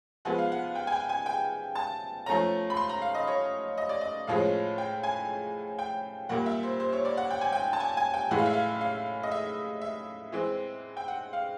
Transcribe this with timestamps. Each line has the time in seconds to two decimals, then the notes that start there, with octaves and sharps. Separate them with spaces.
0.25 F3 G#3 B3 F#5
0.38 F5
0.52 F#5
0.75 G5
0.87 G#5
0.92 G5
1.09 G#5
1.26 G5
1.75 A5
2.26 F3 A3 C#4 A#5
2.70 B5
2.77 C6
2.89 A#5
3.02 F5
3.15 D#5
3.27 C#5
3.78 D#5
3.89 D5
4.01 D#5
4.27 A2 F3 G#3 C#4 F5
4.78 G5
5.03 G#5
5.79 G5
6.29 A#2 G3 A#3 F#5
6.46 E5
6.63 C5
6.80 C5
6.92 C#5
7.05 D5
7.17 F#5
7.30 G5
7.41 G#5
7.52 G5
7.73 A5
7.80 G#5
7.97 G#5
8.14 G5
8.31 A2 E3 G#3 F#5
8.38 F5
8.46 E5
8.53 F5
8.81 F5
9.23 D#5
9.31 E5
9.81 E5
10.32 E3 G#3 C4
10.97 G5
11.08 F#5
11.33 F5